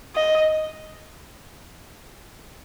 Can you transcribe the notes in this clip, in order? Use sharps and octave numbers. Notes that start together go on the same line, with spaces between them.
D#5